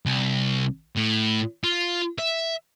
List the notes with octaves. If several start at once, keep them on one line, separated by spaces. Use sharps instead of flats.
C2
A2
F4
E5